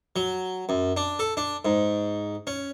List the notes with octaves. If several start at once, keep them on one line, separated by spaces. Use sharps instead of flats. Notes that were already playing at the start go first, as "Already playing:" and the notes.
F#3
F#2
D4
A4
D4
G#2
C#4